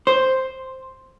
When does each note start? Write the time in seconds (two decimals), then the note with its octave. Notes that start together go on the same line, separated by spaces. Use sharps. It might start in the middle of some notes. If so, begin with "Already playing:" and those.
0.07 C5